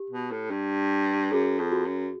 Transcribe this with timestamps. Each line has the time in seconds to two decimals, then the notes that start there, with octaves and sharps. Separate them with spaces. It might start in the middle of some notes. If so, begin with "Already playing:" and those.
Already playing: G4
0.10 B2
0.31 A2
0.51 G2
1.33 F#2 G#4
1.59 F2
1.72 F#4
1.86 F#2